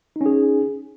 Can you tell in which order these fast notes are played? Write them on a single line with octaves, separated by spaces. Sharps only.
D#4 C#4 G#4